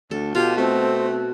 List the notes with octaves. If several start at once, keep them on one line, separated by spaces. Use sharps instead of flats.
D2 A4
B2 F4 G4
A3 C4